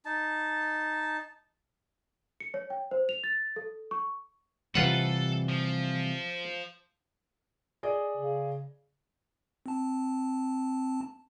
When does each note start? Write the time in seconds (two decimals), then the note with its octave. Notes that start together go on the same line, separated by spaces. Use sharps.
0.05 D#4 A5
2.40 C#7
2.54 C#5
2.70 G5
2.91 C5
3.09 F7
3.24 A6
3.56 A4
3.91 C#6
4.75 C3 E3 G3 F4 A4 B4 F#5
5.49 F3
7.83 G#4 D5 D#5
8.17 C#3
9.66 C4 A5